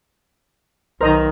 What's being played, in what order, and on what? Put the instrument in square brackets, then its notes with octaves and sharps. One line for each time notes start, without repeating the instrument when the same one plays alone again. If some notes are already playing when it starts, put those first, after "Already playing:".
[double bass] B1 D#3 [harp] A#4 [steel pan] C5 D#5 A#5